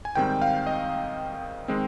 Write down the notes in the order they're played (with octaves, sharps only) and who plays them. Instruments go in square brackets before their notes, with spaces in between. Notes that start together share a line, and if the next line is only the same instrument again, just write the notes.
[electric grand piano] G#5
G#2 D#3 G3 C4 G5
F5
D#5
D#3 G#3 C4